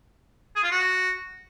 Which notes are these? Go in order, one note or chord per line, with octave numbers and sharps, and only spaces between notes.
G#4
F4
F#4